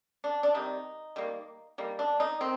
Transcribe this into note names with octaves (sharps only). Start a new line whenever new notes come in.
D4
D4
C3 D#3 G3 D#4
D#3 G3 A#3
D#3 G3 A#3
D4
D#4
D#3 C4